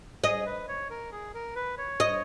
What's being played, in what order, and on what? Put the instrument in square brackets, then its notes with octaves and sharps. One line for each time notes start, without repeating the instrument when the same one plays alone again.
[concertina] G#4 [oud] D#5
[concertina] B4
C#5
A#4
G#4
A#4
B4
C#5
[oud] D#5